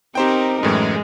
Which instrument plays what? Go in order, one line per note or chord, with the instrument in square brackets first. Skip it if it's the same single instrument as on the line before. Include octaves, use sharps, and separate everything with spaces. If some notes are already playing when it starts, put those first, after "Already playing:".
[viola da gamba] C4 D#4 A#4 [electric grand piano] G4 C5 G5
[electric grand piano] F#2 A2 E3 [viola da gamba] G#3